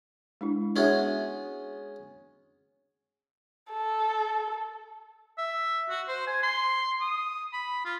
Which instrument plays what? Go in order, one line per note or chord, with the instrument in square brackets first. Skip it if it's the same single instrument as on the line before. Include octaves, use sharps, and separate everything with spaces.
[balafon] G#3 D4 E4
[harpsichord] G#3 B3 C#4 [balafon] D4 F#4 E5
[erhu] A4
[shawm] E5
F#4
C5
G#5
C6
D#6
B5
F4